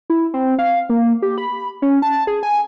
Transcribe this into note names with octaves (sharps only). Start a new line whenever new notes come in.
E4
C4
F5
A#3
G4
B5
C#4
A5
G#4
G#5